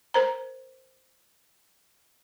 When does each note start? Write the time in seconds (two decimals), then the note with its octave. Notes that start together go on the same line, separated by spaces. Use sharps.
0.14 A#4 C5 A#5